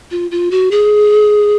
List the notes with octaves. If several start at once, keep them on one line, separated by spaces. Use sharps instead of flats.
F4
F4
F#4
G#4